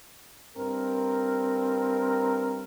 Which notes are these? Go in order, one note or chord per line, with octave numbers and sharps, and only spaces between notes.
G2 C4 A#4